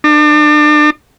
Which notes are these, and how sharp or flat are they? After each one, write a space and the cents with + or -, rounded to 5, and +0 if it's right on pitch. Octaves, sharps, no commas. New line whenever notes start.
D4 +35